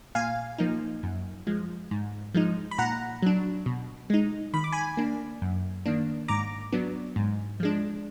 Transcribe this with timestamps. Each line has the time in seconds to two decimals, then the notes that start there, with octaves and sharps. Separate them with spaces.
0.15 A#2 F5 G#5
0.58 F3 A#3 D#4
1.03 F#2
1.47 F3 G#3
1.91 G#2
2.34 F3 G#3 D#4
2.71 B5
2.78 A#2 F#5 A#5
3.22 F#3 D4
3.66 B2
4.10 G#3 D#4
4.54 D#3 B5
4.64 D6
4.72 G#5 B5
4.97 A#3 D4
5.42 F#2
5.86 D#3 A#3 D4
6.28 G#2 A#5 D6
6.72 F#3 B3 D4
7.16 G#2
7.60 F3 G#3 D4